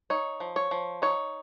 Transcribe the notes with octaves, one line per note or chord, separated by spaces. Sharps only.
D#4 C#5
F3
C#5
F3
D#4 C#5